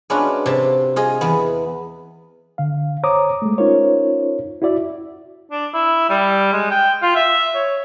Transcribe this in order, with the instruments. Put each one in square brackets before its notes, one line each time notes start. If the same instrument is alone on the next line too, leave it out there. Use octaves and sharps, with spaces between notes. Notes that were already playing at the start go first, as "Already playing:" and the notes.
[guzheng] G#3 B3 C#4 D4 F4 F#4
C3 A5
F4 G#4 D#5
E2 B3
[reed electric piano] D3 F5
C5 C#5 A#5 D6 D#6
G#3 A3
C#4 D#4 F4 A#4 C5 C#5
E4 F#4 D5 E5
[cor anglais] D4
E4
G3
G#3
G5
F4
E5
C#5